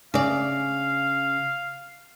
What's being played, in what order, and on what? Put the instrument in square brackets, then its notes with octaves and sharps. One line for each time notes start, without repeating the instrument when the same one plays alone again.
[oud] C#3 D5 [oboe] F5